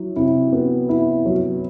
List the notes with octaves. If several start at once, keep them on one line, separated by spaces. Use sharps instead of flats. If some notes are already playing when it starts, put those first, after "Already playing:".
Already playing: F#3 E4
C3 E4
B3
E4
F#3